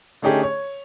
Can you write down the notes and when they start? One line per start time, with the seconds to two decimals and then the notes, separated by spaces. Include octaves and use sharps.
0.22 D3 A3 C#4 D#4 G4 G#4
0.43 C#5